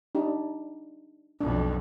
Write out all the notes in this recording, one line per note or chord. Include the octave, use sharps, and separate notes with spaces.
D4 D#4 G4
B1 F2 D4